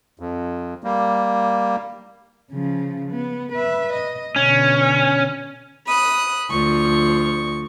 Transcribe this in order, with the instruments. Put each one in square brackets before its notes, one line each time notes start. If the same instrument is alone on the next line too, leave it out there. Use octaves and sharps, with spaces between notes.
[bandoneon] F2
G3 A#3
[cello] C#3 F3
B3
B4 E5
D#5
[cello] B2 D3 [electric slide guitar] C#4
[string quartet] B5 D#6 F#6
D2 F3 C#6